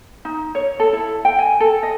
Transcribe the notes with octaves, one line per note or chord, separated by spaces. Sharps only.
D#4
C#5
A4
E4
G5
G#5
A4
D#5